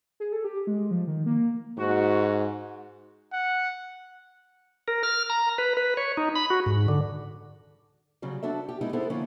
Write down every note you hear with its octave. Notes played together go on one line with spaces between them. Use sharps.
G#4
A4
G4
G#3
F3
D#3
A#3
G#2 F#4
F#5
A#4
F6
A#5
B4
B4
C#5
D#4
B5
F#4
G#2
D3
C#3 F#3 G3
F2 D4 F#4 A4 E5
G4
G#3 B3 D#4 E4
B3 E4 G#4 A4 C5
D3 F3 A#3 C#4 D4 E4